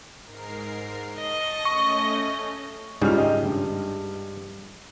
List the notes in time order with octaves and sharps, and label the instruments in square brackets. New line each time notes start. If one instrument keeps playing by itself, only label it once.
[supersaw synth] G#2 A#4 C7
[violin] D#5 [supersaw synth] A5 C#6 A#6
[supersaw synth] A3 C#4 [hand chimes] C#6
[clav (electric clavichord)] G#2 C#3 G3 [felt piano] D#4 F4 F6
[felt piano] D#5 G5
G2